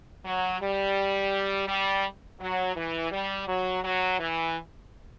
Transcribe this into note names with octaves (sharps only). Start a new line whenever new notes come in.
F#3
G3
G3
F#3
E3
G3
F#3
F#3
E3